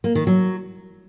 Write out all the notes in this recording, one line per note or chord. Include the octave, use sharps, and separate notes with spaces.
A#3
D#3
F#3